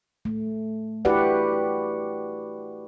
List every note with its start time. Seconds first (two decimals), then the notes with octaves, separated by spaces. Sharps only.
0.25 A3
1.05 E4 F#4 G4 B4 D5 F#5